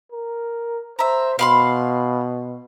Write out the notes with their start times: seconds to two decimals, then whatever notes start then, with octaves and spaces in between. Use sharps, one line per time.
0.12 A#4
0.99 C5 E5 A#5
1.39 B2 F5 B5 C6